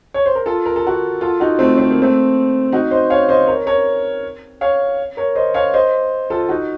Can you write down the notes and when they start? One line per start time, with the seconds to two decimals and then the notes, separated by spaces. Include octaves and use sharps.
0.14 C#5
0.26 C5
0.35 A#4
0.46 F4 A4
0.66 A#4
0.76 A4
0.87 F#4 A#4
1.21 F4 A4
1.40 D#4 F#4
1.59 A3 C4
1.78 C4
1.90 A#3
2.02 A3 C4
2.72 D#4 F#4
2.91 C5 D#5
3.10 C#5 F5
3.29 C5 D#5
3.48 A#4 C#5
3.67 A#4 C#5
4.61 C#5 F5
5.17 A#4 C#5
5.36 C5 D#5
5.54 C#5 F5
5.74 C5 D#5
6.30 F4 A4
6.49 D#4 F#4